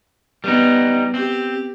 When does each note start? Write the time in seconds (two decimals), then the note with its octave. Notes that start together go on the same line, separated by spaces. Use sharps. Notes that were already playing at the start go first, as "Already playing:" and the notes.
0.44 G3 B3 D#4
1.14 C4 G4